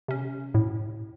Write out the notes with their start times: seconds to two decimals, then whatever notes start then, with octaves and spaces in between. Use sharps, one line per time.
0.08 C3 C#4
0.54 A2